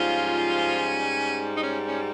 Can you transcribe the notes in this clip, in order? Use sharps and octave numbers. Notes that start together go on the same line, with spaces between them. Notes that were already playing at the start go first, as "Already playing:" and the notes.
Already playing: G#2 F3 G3 C#4 F4
D#4
C#4
C#4